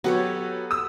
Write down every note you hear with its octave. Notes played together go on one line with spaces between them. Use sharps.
F#3 B3 G4 A4 C#5
D#6 E6